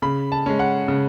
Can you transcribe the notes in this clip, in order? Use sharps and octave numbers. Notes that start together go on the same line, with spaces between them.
C#3 B5
A5
G#3 C#4
F#5
C#3